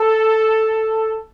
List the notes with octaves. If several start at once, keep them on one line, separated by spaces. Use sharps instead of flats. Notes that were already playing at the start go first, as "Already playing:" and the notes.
Already playing: A4